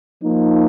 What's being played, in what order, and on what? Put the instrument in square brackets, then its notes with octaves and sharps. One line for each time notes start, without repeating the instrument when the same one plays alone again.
[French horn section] F3 A#3 D#4